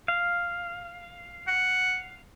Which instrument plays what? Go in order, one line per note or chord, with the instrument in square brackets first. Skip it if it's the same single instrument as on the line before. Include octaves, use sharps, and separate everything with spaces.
[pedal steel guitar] F5
[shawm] F#5